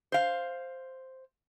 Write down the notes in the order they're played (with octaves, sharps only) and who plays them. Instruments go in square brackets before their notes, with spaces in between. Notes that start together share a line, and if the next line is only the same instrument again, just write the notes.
[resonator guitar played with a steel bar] C5 F5